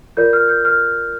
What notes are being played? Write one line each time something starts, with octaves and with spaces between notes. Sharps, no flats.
F4 A#4 D5 G6
F6
G6
F6